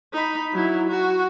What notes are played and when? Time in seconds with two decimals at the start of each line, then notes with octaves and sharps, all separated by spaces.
0.13 D#4 B5
0.53 F#3 E4
0.89 F#4